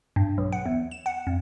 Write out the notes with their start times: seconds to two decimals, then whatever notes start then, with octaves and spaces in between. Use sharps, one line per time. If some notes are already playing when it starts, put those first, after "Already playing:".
0.16 G2
0.38 B1
0.53 F#5
0.65 E2
0.91 E7
1.06 F#5
1.27 F2